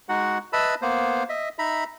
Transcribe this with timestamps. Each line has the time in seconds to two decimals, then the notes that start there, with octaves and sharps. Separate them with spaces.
0.09 G#3 D#4 F#4 F#5
0.53 B4 D#5 E5 A5 B5 E6
0.82 A#3 B3 C5
1.29 D#5 E5
1.59 D#4 E5 A#5 B5